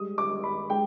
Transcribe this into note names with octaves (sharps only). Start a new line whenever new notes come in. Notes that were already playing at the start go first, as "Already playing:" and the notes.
Already playing: G3 G#3 D#6
D6
G3
B5
G#3 G5